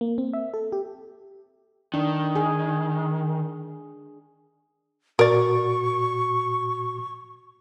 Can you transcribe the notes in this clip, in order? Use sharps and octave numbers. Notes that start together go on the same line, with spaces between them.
A#3
C4
E5
A4
G4
D#3 D4
G#4
A#2 F#4 A#4 D5 C#6